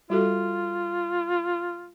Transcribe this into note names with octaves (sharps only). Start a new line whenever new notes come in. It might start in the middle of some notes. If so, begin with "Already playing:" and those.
G3 F4 F#4 A4